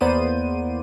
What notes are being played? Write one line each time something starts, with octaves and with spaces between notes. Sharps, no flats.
E2 A#3 B3 C5 D5 D#7